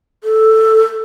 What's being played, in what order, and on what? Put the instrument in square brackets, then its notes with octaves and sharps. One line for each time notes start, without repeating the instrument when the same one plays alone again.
[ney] A4